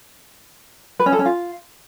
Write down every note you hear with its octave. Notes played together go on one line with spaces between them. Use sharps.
B4
C#4
A4
C#4
F4